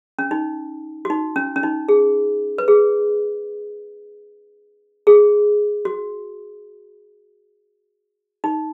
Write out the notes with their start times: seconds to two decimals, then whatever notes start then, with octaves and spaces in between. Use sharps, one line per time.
0.19 C#4
0.31 D#4
1.05 F#4
1.10 D#4
1.36 C#4
1.56 C#4
1.63 D#4
1.88 G#4
2.58 B4
2.68 G#4
5.07 G#4
5.85 F#4
8.44 D#4